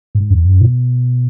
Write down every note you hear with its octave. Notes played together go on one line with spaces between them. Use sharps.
G#2
E2
F#2
B2